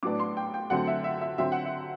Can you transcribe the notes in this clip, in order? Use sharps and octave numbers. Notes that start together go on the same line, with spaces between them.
A2 F#3 B3 D4 D6
C6
G5
G5
F#2 D3 F#3 A3 C4 F#5
E5
E5
E5
D3 F#3 C4 E5
F#5
E5